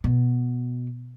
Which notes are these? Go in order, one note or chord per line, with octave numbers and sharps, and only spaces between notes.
B2